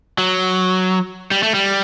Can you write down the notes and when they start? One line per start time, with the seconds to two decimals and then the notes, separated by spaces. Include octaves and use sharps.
0.18 F#3
1.31 G3
1.43 A3
1.54 G3